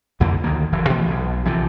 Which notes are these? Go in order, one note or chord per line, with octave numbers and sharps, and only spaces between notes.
C2 F2 D3 A#3
D2 D#3 A#3
F#1 E3
B2 E3 F3 A3
B1
A#1 C3 E3 F3